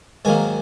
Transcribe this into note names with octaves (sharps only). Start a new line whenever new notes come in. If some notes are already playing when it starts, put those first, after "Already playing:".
G#2 D#3 F#3 A#3 G#5